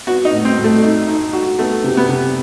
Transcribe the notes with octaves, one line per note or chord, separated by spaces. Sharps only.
B3 F#4
D#4
A2
C4
A2
A3
D#4
D#4
F#4
A3 B3
C3
B3
C3